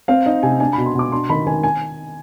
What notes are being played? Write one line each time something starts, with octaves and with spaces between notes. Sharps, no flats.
C4 F5
D#4
C3 G#5
D4 G#5
B2 B5
C6
B2 D6
D4 C6
D#3 B5
D#3 G#5
G#5